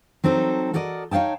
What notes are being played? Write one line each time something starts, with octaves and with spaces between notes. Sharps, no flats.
F#3 C4 D#4 A4
F#4 A4 A#4 D5 D#5
D#4 C#5 F5 G5 A5